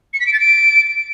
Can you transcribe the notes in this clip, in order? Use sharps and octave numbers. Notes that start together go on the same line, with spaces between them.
C#7
B6
D7
A6
D7